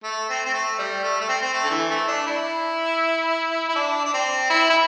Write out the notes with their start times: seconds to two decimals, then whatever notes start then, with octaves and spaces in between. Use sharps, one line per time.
0.04 A3
0.29 C4
0.46 C4
0.53 A3
0.78 G3
1.04 A3
1.20 A3
1.28 C4
1.42 C4
1.53 A3
1.64 D3
1.71 E3
1.90 A3
2.08 D4
2.26 E4
3.69 E4
3.76 D4
4.05 D4
4.13 C4
4.50 E4
4.70 E4